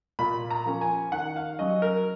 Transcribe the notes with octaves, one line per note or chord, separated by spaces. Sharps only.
A#2 B5
A#5
F3 A#3 C#4
G#5
D#3 F#5
F5
F#3 C#4 D#5
A#4